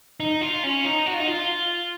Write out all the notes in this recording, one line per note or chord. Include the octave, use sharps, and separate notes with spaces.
D#4
F4
C#4
D#4
F#4
F4
D#4
F4